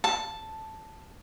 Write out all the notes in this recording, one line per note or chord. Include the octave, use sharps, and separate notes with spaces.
A5